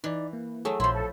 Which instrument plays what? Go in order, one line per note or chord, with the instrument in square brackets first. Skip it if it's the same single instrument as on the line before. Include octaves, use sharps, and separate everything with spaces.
[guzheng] E3 [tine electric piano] D#4 D5
[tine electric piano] A#3
[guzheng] F#3 A3 [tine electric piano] G#4 A4
[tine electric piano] A#1 E5 [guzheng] F3 E4 [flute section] C6
[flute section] A4